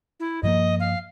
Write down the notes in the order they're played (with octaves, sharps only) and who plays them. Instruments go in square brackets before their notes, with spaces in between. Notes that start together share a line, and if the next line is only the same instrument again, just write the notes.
[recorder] E4
[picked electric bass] G2 F3 A#3 [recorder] D#5
[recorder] F5